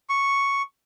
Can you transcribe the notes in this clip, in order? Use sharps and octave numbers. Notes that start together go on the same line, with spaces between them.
C#6